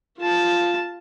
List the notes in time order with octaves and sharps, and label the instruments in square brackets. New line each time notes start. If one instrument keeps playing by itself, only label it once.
[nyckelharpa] F4 A5